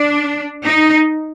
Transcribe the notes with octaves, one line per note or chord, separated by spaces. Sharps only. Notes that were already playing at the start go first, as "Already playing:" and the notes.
Already playing: D4
D#4